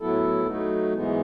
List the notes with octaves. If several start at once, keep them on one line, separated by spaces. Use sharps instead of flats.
A2 F#3 B3 E4 A4
F#3 A3 D#4
G#2 E3 G#3 B3